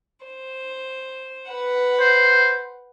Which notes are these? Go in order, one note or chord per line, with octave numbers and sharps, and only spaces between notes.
C5
B4 F#5
C5